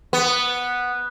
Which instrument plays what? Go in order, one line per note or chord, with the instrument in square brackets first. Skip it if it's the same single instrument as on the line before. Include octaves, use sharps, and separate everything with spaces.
[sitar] B3